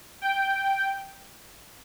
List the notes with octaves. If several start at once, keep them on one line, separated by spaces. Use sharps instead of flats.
G5